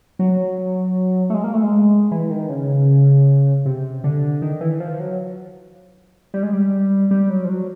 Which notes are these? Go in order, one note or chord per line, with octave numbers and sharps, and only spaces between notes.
F#3
A3
G#3
A#3
A3
G#3
E3
D#3
C#3
C3
D3
D#3
E3
F3
F#3
G3
G#3
G3
G3
F#3
F3
F#3